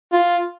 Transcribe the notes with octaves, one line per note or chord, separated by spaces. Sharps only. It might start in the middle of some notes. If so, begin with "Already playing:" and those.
F4